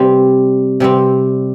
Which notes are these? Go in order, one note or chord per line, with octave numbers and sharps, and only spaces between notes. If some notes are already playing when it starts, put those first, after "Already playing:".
Already playing: C3 G3 C4
C3 G3 C4